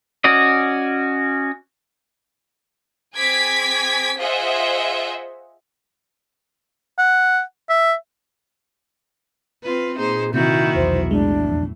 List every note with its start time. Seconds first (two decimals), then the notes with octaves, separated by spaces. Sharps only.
0.24 C#4 F#4 D5 D#5
3.16 C4 G#4 D6 G#6 B6
4.18 F4 G#4 C5 D#5 E5 F#5
6.98 F#5
7.69 E5
9.63 C4 F4 B4
9.99 A#2 D#4 G#4 C5
10.34 C3 D#3 E4 F#4 G6
10.75 B1 E2 C5
11.11 A2 G#3 D4
11.44 F2